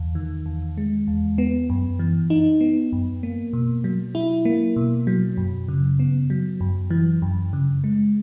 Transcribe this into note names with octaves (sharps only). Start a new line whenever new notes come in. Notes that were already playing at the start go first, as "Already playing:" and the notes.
Already playing: E2
D#3
E2
G#3
E2
B3
F#2
E3
D#4
B3
F#2
A#3
B2
F#3
E4
A#3
B2
F#3
F#2
C#3
B3
F#3
F#2
E3
F#2
C#3
G#3